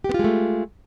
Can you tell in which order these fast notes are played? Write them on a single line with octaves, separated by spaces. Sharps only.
G4 B3 F4 G#3 A3